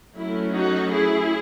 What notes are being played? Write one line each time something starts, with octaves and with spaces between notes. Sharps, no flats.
F#3 A3 C#4 E4
D#4 F#4
E4 G#4